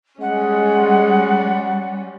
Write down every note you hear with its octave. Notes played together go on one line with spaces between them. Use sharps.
G3 G#3 C#4 F#5